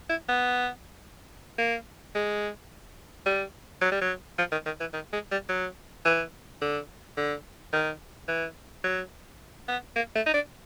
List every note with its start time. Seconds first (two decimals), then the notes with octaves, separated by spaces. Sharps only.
0.10 E4
0.29 B3
1.59 A#3
2.15 G#3
3.26 G3
3.81 F#3
3.92 G3
4.01 F#3
4.38 F3
4.52 D#3
4.66 D#3
4.80 E3
4.94 D#3
5.13 G#3
5.31 G3
5.49 F#3
6.05 E3
6.62 D3
7.17 D3
7.73 D#3
8.28 E3
8.84 F#3
9.68 B3
9.96 A#3
10.15 A3
10.26 D#4
10.34 D4